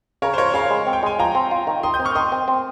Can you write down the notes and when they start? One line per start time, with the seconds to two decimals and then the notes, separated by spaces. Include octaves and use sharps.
0.22 C#3 A#4 C#5
0.34 C5
0.38 F3 A#4 C#5
0.54 C#3 C#5 F5
0.70 G#3
0.87 C4
0.93 G5
1.03 G#3 G#5
1.19 F3 G5 A#5
1.35 C4
1.51 F4
1.67 D#3
1.83 D#3 C6 D#6
1.94 D#6 G6
2.00 C4
2.05 C#6 F6
2.15 D#3 C6 D#6
2.32 C4
2.48 C4